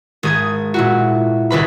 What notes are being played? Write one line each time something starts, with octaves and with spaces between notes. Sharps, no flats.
G#1 G#4 G#6
A#2 E4 F#4
G#1 C#2 B4 B5